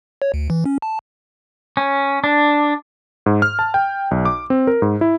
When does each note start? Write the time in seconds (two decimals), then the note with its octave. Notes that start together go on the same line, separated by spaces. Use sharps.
0.22 C#5
0.34 D2
0.50 E3
0.66 C#4
0.82 A5
1.77 C#4
2.24 D4
3.26 G#2
3.42 F6
3.59 A5
3.74 G5
4.11 B1
4.25 D6
4.50 C4
4.67 A#4
4.82 G#2
5.01 E4